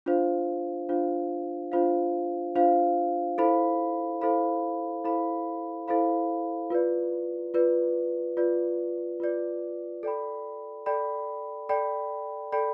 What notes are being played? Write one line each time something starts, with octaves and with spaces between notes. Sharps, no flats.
D4 F4 C5 F5
D4 F4 C5 F5
D4 F4 C5 F5
D4 F4 C5 F5
E4 A4 C5 F5 B5
E4 A4 C5 F5 B5
E4 A4 C5 F5 B5
E4 A4 C5 F5 B5
F4 B4 D5
F4 B4 D5
F4 B4 D5
F4 B4 D5
A4 D5 G5 B5
A4 D5 G5 B5
A4 D5 G5 B5
A4 D5 G5 B5